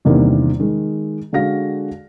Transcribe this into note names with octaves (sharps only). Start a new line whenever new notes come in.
E2 G2 C3 D#3 G3 A#3
D#3 G#3
D3 G#3 F#4 F5 A#6